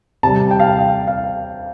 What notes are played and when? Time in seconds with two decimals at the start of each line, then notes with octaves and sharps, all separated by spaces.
0.23 C3 G3 A5
0.51 G5
0.60 F5
0.67 G5
0.79 F5
1.07 F5